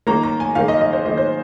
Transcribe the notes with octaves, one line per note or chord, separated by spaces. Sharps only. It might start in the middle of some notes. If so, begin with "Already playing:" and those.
D#3 A#3 A#5
A#5
G#5
D#3 A#3 F5
D#5
D#5
C5
D#3 A#3 D#5
C5